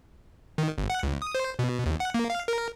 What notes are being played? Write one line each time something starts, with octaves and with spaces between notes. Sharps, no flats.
D#3
G1
F#5
C#2
D#6
C5
B2
D#2
F#5
A#3
F5
A#4